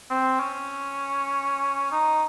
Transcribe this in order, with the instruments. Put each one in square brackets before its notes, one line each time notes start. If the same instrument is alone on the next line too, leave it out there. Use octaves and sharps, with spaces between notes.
[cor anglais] C4
C#4
D#4